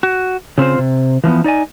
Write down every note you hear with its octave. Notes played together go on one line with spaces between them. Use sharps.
F#4
C#3 C4 F4 C5
C3
E3 F3 A#3 B3
D#4 D5 D#5 G#5